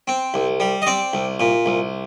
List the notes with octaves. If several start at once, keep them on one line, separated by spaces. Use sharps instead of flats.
C4
C2
G3
D#5
C4 D5
C2
A#2
C2